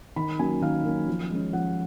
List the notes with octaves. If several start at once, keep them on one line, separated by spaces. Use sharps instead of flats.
D#3 B5
F#3 A#3 C#4 G#5
D#3 F5
F#3 A#3 C#4
F3
G#3 C#4
F3 F#5